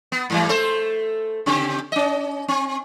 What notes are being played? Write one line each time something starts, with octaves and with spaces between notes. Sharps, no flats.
B3
G#2 E3 G3
A3 A4 C5
C#3 C4 G4
C#4 D#5
C4